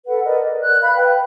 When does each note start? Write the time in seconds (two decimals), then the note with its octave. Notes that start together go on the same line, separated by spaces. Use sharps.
0.06 A4 B4 F#5
0.24 A#4 B4 D5 D#5
0.38 D5
0.61 F#6
0.81 F5 B5
0.96 B4 G5